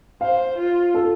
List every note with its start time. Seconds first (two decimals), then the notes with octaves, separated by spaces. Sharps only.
0.21 C5 F5
0.58 F4
0.94 A4